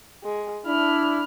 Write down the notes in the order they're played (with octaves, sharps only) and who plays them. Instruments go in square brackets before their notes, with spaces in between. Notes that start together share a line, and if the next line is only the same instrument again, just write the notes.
[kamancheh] G#3
[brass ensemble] D4 E4 [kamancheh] B5 F6